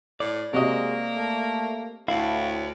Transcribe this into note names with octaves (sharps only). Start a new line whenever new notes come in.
A2 D5
C3 G#3 A#3 F#4 D#5
A3
D2 A2 E4 F5